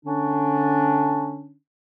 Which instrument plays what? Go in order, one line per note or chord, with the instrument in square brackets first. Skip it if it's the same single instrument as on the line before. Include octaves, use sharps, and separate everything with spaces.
[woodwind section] D3 C#4 D4